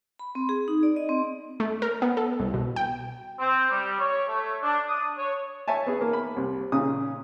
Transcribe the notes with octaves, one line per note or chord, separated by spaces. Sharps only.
B5
C4
G#4
D#4
D5
D#5
C4
A3
A#4
B3
A4
C2
B2
G5
C4
G3
C#5
A3
D4
D#6
C#5
C#5 E5 G#5 A5
B3 G#4
A#3
B5
C2
A#2 C#3 D#6